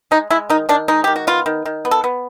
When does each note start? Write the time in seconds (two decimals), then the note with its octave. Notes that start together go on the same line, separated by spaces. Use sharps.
0.11 G#3 D#4
0.30 G#3 E4
0.50 D#3 D#4
0.69 D#3 D4
0.88 G#3 D#4
1.04 D#3 G4
1.16 F#4
1.27 B3 F4
1.46 D#3
1.65 D#3
1.85 B3
1.91 A4
2.04 B3